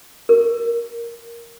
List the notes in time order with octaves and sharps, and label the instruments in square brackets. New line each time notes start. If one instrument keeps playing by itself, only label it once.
[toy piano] A#4